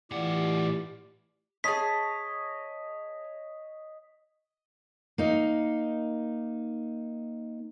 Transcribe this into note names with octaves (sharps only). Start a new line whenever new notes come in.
A2 E3 F4 G4 D5 F#5
G#4 C#5 D#5 A5 B6
A#3 D#4